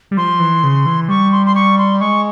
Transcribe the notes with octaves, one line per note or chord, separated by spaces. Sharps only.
G3
F3 C6
E3
C#3
E3
G3 C#6
C6
C6
G3 C#6
C6
G3
G#3 C#6